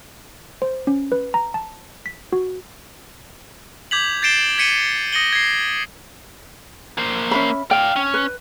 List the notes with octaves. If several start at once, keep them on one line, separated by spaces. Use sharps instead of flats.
C5
C#4
B4
A#5
A5
B6
F#4
D6 G6 G#6 B6 F7 F#7
G6 A6 C7 D7 E7 G7
G#6 B6 C#7 D#7 G7
D#6 A#6 C#7 D#7 F#7 G7
G#6 C7
A#3 C5
C#4 E5 B5
D5 F5 G5
C#4
B4